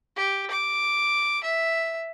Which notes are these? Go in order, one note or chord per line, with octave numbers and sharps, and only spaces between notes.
G4
D6
E5